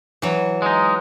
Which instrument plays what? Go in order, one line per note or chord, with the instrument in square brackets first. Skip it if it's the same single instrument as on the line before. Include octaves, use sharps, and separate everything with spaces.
[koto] E3 F#3
[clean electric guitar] G#3 D#4